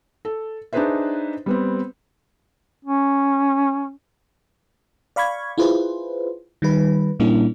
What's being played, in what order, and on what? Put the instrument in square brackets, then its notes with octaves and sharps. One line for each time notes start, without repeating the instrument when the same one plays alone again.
[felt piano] A4
D4 D#4 G#4 B4 C5 E5
G3 B3 C4
[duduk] C#4
[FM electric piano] D5 F5 B5 C#6 G#6
E4 F4 G#4 B4 C5
D#3 G3 B4
A#2 G3 A#3 C#4 D4 E4